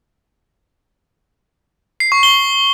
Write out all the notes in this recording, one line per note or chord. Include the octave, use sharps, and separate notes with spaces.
C7
C#6
G7